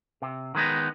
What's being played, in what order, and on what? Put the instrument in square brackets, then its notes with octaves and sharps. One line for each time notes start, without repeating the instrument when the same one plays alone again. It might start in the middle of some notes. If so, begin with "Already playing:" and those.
[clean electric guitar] C3
D#3 G#3 B3 D#4